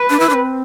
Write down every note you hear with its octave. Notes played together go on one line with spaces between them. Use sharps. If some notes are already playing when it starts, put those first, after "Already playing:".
Already playing: B4
D4
E4
D4
C4